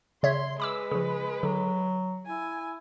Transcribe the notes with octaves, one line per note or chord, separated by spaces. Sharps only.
C#3 C#5 E5 C6
G#3 B4 B5 D6 E6
C#3 F3
D3 F#3
E4 G#5